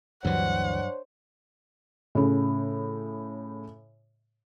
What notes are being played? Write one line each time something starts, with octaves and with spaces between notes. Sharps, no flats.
D2 G2 E3 F#3 D4 C5 C#5 F#5
A2 C#3